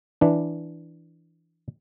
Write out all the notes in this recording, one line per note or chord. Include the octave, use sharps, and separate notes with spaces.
E3 D4